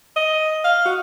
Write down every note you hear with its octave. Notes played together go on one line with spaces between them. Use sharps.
D#5
F5
F#4